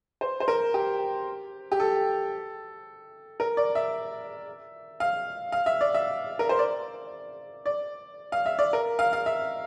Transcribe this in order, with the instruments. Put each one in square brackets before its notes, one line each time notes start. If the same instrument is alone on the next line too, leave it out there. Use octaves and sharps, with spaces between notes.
[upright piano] C5
C5
A#4
G4
G4
A4
A#4
D5
E5
F5
F5
E5
D5
E5
A#4
C5
D5
D5
F5
E5
D5
A#4
F5
F5
E5